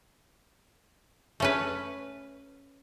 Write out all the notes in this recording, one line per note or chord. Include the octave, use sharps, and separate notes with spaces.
A3 C#4 B4